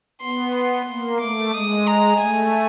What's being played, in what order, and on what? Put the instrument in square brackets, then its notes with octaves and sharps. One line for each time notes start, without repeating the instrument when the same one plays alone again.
[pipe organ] B3 [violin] C6
[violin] C6
[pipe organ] A#3
[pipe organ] A3 [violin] D6
[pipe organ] G#3 [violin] D#6
[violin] A#5
[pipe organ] A3 [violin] G#5